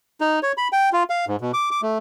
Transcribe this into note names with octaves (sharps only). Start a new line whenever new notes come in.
D#4
C#5
B5
G5
F4
F5
G#2
B2
D6
D6
A3